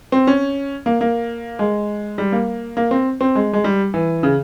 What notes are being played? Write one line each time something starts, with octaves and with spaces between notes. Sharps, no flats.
C4
C#4
A#3
A#3
G#3
G3
A#3
A#3
C4
C4
G#3
G#3
G3
E3
C#3